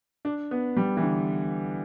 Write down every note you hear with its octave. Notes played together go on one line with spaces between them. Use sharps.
D4
B3
G3
E3
D3